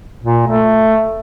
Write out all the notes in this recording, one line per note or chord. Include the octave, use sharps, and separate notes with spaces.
A#2
A3